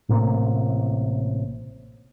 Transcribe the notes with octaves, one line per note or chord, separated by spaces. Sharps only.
A1 A2 C3 A#3